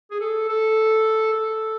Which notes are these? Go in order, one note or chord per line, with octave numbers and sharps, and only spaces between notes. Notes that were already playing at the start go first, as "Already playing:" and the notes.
G#4
A4
A4
A4